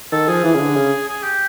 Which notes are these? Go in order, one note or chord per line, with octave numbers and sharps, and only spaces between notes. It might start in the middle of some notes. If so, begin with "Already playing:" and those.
D#3 A4
F3 G#4
E3
C#3
D3
C#3
G#4
G4